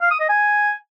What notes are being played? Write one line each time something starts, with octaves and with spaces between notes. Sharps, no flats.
F5
D#6
D#5
G#5